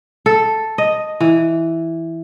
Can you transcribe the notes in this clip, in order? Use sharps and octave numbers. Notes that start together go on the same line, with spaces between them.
A4
D#5
E3